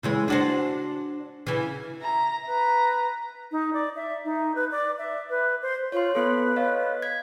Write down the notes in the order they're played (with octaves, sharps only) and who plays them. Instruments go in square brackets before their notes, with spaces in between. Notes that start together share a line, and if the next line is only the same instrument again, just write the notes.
[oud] C#3 E3 G#3
D4 F#4 C5
C#3 E3
[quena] E5 [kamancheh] A#5
[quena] B4 [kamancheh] A#5
[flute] D#4
D5
E5
D#4
B4
D5
E5
B4
C5
[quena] F4 [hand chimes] C#5 C6
[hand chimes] B3 A4 [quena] B4
[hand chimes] C#5 D#5 F5
G#6 B6